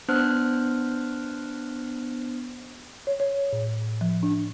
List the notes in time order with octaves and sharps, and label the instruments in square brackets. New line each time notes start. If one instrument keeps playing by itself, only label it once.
[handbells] B3 D4 C5 F6 F#6
[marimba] C#5
C#5
A2
F3
D4